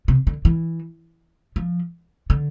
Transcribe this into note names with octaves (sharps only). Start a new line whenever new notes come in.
C3
D3
E3
F3
D3